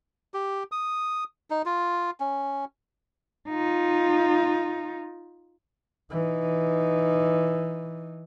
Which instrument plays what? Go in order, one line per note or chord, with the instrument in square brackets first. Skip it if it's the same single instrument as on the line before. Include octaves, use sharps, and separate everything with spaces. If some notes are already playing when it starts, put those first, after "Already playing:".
[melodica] G4
D#6
D#4
F4
C#4
[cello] D#4 F4
[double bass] E3 D#4